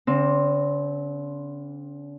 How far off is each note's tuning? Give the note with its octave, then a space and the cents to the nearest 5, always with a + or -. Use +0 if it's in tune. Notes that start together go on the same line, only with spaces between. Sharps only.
D3 -40 C4 +10